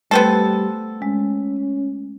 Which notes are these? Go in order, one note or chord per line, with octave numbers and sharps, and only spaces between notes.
G3 A3 B3 C4 A4
G#3 C#4